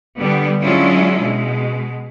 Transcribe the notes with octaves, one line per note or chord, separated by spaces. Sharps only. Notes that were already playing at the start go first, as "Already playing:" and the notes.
D3 G3 B3
F#3 G#3 C#4 D4 E4 F4
B2 G#3